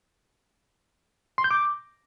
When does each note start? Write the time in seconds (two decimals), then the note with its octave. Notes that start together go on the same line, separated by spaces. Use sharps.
1.38 C6
1.44 G6
1.51 D6